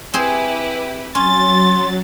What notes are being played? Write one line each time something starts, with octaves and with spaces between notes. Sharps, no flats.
C4 E4 G4 G#4 B4 C5
F#3 C#4 C6 A6